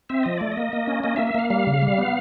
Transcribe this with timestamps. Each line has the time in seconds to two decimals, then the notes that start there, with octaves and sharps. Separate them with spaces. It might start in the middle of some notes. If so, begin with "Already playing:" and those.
0.09 C4 E5
0.23 F3 D#5
0.38 A3 D5
0.51 D#5
0.57 A#3
0.73 A#3
0.87 C#4
1.04 A#3 D#5
1.16 E5
1.19 A#3
1.27 E5
1.34 A#3 F5
1.50 G3 F5
1.67 C#3
1.82 G3
1.98 B3